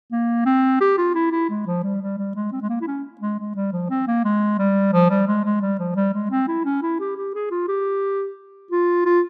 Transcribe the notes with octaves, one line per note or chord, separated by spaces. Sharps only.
A#3
C4
G4
F4
E4
E4
G#3
F3
G3
G3
G3
G#3
C4
G#3
A#3
E4
C#4
G#3
G#3
G3
F3
C4
A#3
G#3
G3
F3
G3
G#3
G#3
G3
F3
G3
G#3
C4
E4
C#4
E4
G4
G4
G#4
F4
G4
F4
F4